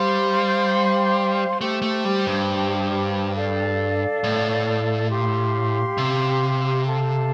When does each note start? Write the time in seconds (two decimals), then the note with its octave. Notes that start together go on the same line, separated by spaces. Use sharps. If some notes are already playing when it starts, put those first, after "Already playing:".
Already playing: G3 C5 F5 C6
1.60 A3 G4 C5 G5
1.82 A3
2.05 G3
2.26 G2
3.35 A4 D5 F5
4.24 A2
5.10 G4 F5 C6
5.98 C3
6.86 A4 F5 A5